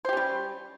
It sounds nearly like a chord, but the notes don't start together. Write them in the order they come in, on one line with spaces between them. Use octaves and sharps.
C5 G4 C#4 G3